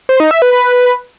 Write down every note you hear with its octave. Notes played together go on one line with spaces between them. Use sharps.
C5
D#4
E5
B4
B4